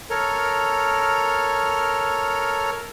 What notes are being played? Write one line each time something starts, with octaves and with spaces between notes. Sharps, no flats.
A4 A#4 C#5 F6